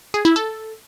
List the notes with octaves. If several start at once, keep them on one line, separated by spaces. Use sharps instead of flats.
G#4
E4
A4